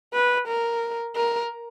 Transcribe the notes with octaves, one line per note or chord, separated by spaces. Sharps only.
B4
A#4
A#4